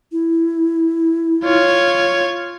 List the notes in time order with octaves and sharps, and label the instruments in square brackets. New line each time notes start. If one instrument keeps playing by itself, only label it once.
[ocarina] E4
[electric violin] F4 C#5